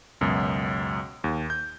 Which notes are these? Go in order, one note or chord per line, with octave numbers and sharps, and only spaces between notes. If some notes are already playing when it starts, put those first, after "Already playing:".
C#2 F#2 B2
D#2
G6